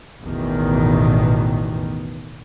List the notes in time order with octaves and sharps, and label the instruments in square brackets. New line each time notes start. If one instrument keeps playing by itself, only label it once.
[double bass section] A1 E2 B2 D#3